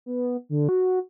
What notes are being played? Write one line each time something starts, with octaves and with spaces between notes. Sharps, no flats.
B3
D3
F#4